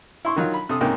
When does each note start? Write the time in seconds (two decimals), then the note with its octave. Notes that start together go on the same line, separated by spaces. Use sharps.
0.25 E4 C6 C#6
0.36 D#3 F#3 F4
0.54 B5
0.69 C3 A4 D#6
0.81 C#2 G#2 C3 A#3 G5